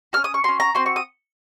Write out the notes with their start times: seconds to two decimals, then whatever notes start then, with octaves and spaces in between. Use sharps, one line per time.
0.13 C#4 F#4 F6
0.24 D#6
0.34 C#6
0.44 C#4 F#4 C6
0.60 A#5
0.75 C4 F#4 C6
0.86 C#6
0.96 D#6